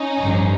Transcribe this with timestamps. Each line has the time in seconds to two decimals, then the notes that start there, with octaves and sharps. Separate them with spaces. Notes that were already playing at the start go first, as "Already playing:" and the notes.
Already playing: C#4 D#4
0.18 A1 G2 D3 F3